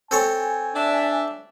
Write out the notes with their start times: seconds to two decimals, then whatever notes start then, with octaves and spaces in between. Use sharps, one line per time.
0.11 C4 A4 C#5 G#5
0.75 D4 E5